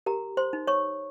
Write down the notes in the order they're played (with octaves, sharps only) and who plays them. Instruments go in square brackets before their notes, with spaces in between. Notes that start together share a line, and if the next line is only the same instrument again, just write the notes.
[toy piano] G4 A#4 A#5
C5 C6
D#4
C#5 C#6